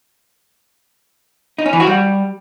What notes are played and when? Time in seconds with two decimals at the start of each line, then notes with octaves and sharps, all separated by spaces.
1.58 D#4
1.66 C#4
1.73 E3
1.80 F#4
1.87 G3